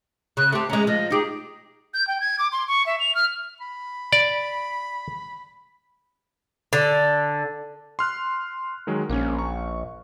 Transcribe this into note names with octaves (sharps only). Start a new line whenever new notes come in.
C#3 F#6
A3 C4 G4
G#3 C#4 A#5
F3 D#5
D#4 G4 G#4
G6
G5
G#6
D6
C6
C#6
E5
F7
F6
B5
D5
D3
C6 F6 F#6
D#3 F#3 G#3
A#1 A#3 C#4
C#6